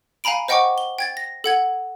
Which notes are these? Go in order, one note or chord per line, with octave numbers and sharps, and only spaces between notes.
F5 G#5 A#5 B5 D7
C5 D#5 F#5 G5 C#6 D6
G7
G5 G#6 A6
A#6
A4 F#5 G#6